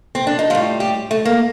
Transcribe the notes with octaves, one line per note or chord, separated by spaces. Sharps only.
C4
D4
D#4
A2 G3 F4
G4
A3
A#3